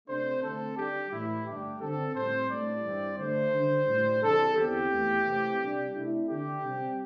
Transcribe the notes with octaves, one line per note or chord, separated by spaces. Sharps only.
C3 A3 D4 C5
D3 A3 C4 A4
D3 G3 D4 G4
A2 E3 G3 E4
G2 D3 A3 D4 G4
D3 C4 A4
A2 G3 C4 C5
A2 G3 D4 D5
G2 E3 G3 C4
D3 A3 D4 C5
D3 G3 D4
A2 G3 D4
C3 E3 G3 D4 A4
E2 D3 C4 G4
E2 E3 A3
C3 E3 A3 C4
C3 G3 D4
C3 A3 D4 E4
D3 A3 D4 G4
C3 G3 C4